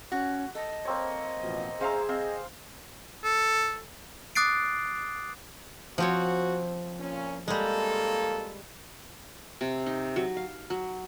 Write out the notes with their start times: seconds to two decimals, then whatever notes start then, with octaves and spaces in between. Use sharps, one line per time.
0.12 C#4 F#4
0.55 A4 D#5
0.85 A#3 C4 C#5
1.41 A1 B2 F3
1.81 C#4 G#4 C5 E5 F5 A#5
2.09 C4 D#5 F5
3.24 A4
4.35 D6 D#6 F#6 A6 C7 D7
5.98 F3 C4 F#4 C#5
6.98 A#2 C#4
7.48 F2 G3 G#3 A#3 A4
9.61 C3
9.86 D#4
10.16 F#3
10.37 F5
10.70 F#3